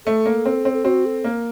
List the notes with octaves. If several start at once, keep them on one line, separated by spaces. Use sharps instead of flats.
A3 A4
A#3
C4
C4
A4
C4 F#4
A4
A#3